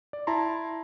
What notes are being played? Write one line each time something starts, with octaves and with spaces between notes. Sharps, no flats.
D5
E4 A5 A#5 C6